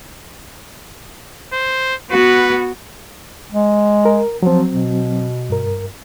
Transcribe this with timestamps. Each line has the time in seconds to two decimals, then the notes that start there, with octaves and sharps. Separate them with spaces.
1.53 C5
2.11 B3 F#4 B4
3.52 G#3
4.05 A#4
4.43 F3 F#3 C4
4.72 B2
5.50 G2 A#4